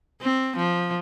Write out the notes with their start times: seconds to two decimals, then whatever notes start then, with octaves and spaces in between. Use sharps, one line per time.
0.21 C4
0.56 F3